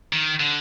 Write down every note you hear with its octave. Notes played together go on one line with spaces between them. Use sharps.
D#3
D3